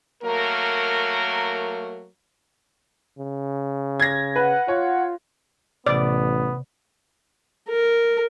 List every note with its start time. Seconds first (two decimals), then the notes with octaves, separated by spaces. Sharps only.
0.23 F#3 A3 A#3 A#4
3.18 C#3
4.00 G#6 A#6
4.36 B4 F#5
4.68 F4 C#5
5.86 A1 C3 B3 D5
7.69 A#4